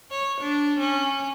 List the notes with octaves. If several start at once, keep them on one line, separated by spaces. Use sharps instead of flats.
C#5
D4
C#4